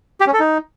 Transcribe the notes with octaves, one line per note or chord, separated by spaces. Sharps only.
G4
C#4
A4
D#4